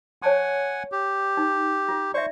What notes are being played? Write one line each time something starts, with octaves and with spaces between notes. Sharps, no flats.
C#5 F#5 G#5 A5 C#6
G4
D#4
F4
C5 D5 E5 C#6